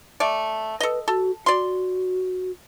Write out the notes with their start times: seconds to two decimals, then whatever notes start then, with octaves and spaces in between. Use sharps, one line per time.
0.20 A3 D5
0.80 A4 B4 D#5
1.08 F#4 A4
1.46 F#4 D5 C6